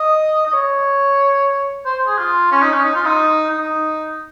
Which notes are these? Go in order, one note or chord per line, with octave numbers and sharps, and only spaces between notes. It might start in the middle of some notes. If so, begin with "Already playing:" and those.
Already playing: D#5
D#5
C#5
C5
G#4
F4
C#4
D#4
C#4
D#4
F4
D#4
D#4